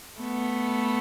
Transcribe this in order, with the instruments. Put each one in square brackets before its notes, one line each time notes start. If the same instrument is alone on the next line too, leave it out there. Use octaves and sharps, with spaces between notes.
[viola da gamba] A3 B3